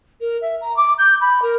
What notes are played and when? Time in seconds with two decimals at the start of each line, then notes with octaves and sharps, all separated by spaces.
0.20 A#4
0.41 E5
0.61 A#5
0.76 D6
0.98 G6
1.20 B5
1.42 A#4